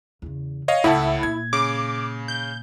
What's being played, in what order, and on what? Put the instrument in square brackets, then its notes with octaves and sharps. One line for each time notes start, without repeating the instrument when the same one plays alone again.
[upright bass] E2 C#3
[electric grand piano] C#5 D#5 F5
[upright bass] C#2 [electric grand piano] A2 F#5 A5 [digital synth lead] E4
[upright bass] A#2 [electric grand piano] G#6
[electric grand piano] C#3 [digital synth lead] D6
[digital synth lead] G6